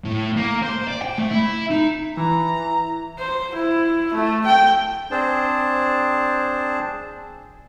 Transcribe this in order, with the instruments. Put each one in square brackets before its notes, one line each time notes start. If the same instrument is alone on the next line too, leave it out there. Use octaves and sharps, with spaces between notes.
[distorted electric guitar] A2
A#3
C5
D5
G5
A3
E4
D#4
[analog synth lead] E3 [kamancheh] A#5
[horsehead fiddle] C5
E4
A3
G5
[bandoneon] C4 D4 G#4 C5 A5